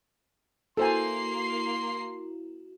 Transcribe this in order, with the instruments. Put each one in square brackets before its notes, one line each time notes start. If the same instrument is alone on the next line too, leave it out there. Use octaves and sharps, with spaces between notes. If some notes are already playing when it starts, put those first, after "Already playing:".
[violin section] A#3 C7 [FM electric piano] E4 F#4 [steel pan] A4 C5 G#5 [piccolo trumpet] C6